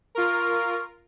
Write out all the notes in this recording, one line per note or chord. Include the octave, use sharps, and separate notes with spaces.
F4 A#4 C#6 F6